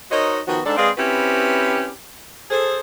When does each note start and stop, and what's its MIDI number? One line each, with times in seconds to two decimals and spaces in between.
0.11 0.39 63
0.11 0.39 66
0.11 0.39 70
0.11 0.39 72
0.11 0.39 73
0.11 0.39 75
0.47 0.60 51
0.47 0.60 53
0.47 0.60 59
0.47 0.60 66
0.66 0.77 44
0.66 0.77 62
0.66 0.77 69
0.77 0.90 56
0.77 0.90 60
0.77 0.90 68
0.77 0.90 71
0.77 0.90 74
0.77 0.90 77
0.98 1.91 60
0.98 1.91 61
0.98 1.91 64
0.98 1.91 66
0.98 1.91 67
0.98 1.91 71
2.51 2.80 68
2.51 2.80 69
2.51 2.80 72